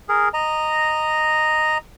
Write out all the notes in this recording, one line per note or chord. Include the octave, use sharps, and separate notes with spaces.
G#4 A#4
D#5 A#5